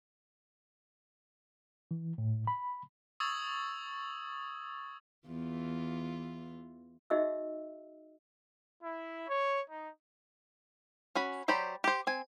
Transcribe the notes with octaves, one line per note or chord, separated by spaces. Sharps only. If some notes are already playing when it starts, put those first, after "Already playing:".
E3
A2
B5
C#6 D#6 E6 G#6 A6 F#7
E2 E3 F4
D#4 F#4 G#4 D#5 E5 E6
E4
C#5
D#4
C#4 F#4 B5
F#3 G4 C5 D5 B5
G4 C5
C4 G#5